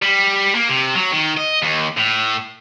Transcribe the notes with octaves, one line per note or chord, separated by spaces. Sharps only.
G3
A#3
C3
F#3
D#3
D#5
D#2
A2